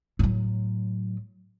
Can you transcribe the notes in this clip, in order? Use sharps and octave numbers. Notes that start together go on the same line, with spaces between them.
A2 F#3